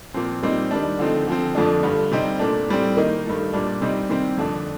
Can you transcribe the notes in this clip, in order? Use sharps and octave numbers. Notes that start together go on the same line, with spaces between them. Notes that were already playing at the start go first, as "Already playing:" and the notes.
A#2 F3 C4
A#2 G3 C4 D#4
D#3 G3 D4
D3 F3 A3 C4 D#4
D3 F3 C4
F2 D3 F3 A3 D4
G2 D3 A3
C3 G3 C4 D#4
A#2 A3 D4
A2 G3 C4
D#3 A#3 D#4
G2 D#3 A3
A#2 G3 D4
C3 G3 C4 D#4
C3 D#3 G3 C4
F2 D3 A3 D4